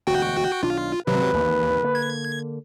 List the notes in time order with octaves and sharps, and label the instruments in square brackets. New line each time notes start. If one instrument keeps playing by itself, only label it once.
[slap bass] E1 D2 [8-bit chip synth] F#4 G5
[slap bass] B1 D#3 D4 [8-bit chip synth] F4
[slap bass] G#1 [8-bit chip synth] C3 F#3 [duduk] B4
[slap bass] G#1 E3 A#3 [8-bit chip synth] D#2
[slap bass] D3 A#3
[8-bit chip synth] G#6